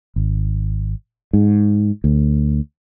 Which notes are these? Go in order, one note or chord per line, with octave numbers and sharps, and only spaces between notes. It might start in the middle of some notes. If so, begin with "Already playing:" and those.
G#1
G#2
D2